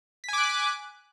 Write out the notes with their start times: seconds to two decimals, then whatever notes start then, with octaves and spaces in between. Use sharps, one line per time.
0.24 B6
0.28 G#5
0.33 D6
0.38 F#6